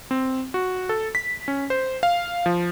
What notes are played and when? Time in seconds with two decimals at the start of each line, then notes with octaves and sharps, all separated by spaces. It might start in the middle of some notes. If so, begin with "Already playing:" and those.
0.11 C4
0.54 F#4
0.89 A4
1.15 B6
1.48 C#4
1.70 C5
2.03 F5
2.46 F3